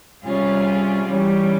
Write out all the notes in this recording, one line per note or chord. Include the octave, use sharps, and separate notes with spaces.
C3 G3 C#4 F4 G#4
E3 G3 C#4